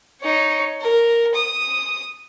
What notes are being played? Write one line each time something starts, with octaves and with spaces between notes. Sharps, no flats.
D#4 C#5
A#4
D#6